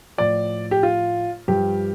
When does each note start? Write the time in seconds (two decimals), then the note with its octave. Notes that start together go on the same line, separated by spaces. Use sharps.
0.18 A2 F3 D5
0.71 G4
0.83 F4
1.48 G2 F3 G4